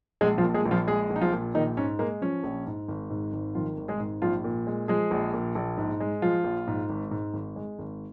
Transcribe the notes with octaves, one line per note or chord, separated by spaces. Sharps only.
A#1 G#3 G#4
F3 F4
A#2
G#3 G#4
A#1
F3 F4
G#3 G#4
A#1
D#4
F3 F4
A#2
A#1 D#3 D#4
G#2 C#4
G#3 A#3
F3 C#4
A#1
G#2
G#1
G#2
G#1
D#3 F3 F4
G#1
G#3 G#4
G#2
A#1 F3 F4
A#2
G#3
F3 G#3 G#4
A#1
A#2
A#1
G#2
G#3
F3 F4
A#1
G#2
G#1
G#2
G#1
G#3
G#1